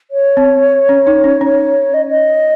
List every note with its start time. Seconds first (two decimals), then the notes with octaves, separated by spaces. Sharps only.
0.11 C#5
0.37 C4
0.89 C#4
1.07 D#4
1.24 C#4
1.41 C#4 C#5
1.94 D#5
2.10 D#5